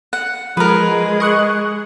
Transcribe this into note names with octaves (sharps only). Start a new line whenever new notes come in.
F#5
F3 G#3 G#4 A#4 B4
D#5 C#6 F#6